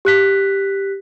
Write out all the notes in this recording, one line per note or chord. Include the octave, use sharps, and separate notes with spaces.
G4 F#6 B6